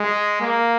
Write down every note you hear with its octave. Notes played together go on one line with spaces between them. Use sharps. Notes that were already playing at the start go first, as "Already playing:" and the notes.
Already playing: G#3
A#3